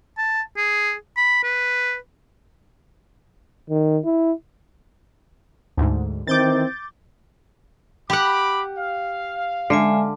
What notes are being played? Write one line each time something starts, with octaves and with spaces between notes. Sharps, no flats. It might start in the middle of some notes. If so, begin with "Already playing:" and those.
A5
G#4
B5
B4
D#3
E4
D2 G#2
D#3 E3 C4 D6 G6 A6
G4 F#5 B5 D6
F5
D3 G#3 E5 G#5